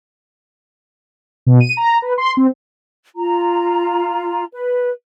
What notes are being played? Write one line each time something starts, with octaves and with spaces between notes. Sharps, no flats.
B2
D#7
A#5
B4
C6
C4
F4 A#5
B4